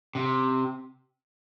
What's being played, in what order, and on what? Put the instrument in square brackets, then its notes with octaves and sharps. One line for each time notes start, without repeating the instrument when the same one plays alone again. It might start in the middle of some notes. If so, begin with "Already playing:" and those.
[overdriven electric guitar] C3